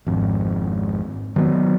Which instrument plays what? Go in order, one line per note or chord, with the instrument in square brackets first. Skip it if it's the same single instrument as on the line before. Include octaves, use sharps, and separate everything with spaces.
[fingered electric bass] G#1 F2
D#3 F#3 G3 B3